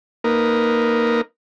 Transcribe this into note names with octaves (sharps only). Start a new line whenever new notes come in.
A#3 D#4 A#4 B4